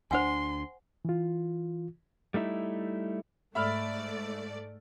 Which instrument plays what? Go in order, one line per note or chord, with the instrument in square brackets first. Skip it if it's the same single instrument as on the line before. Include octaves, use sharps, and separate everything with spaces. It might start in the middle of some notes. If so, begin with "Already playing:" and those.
[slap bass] D2 D4 [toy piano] C5 F#5 G#5 [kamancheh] C6
[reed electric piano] E3 F4
[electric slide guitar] G3 A3 D#4 E4
[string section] G#2 A3 D5 [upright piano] E5 B5 F6